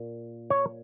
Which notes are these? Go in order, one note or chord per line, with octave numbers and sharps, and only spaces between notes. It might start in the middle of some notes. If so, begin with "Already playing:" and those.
Already playing: A#2 A#3
C#5